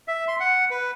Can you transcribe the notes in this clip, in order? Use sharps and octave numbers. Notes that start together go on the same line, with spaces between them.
E5
C6
F#5
B4